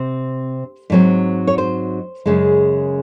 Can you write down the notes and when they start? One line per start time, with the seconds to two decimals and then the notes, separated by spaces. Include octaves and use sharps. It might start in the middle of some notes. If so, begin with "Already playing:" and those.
Already playing: C3 C4 C5
0.90 G#2 F#3 C4
1.47 C#5
1.58 C5
2.26 F#2 C#3 G#3